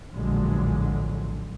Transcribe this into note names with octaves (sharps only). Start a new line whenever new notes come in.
A#1 E2 A2 D3 F#3 G#3